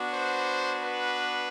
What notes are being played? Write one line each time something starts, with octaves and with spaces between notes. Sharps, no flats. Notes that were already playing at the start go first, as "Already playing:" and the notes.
Already playing: B3 D4 F#4
C5
B4